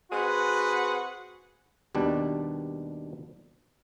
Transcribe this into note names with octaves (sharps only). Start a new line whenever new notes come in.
C4 F#4 G#4 B4 F#5
D#2 B2 G3 D4